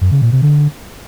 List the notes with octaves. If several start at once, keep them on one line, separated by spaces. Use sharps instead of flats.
F#2
C#3
A#2
C3
D3